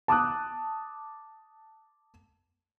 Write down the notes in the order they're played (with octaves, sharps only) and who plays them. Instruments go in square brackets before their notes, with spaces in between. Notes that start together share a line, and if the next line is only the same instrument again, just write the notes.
[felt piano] A5 D6 D#6 F#6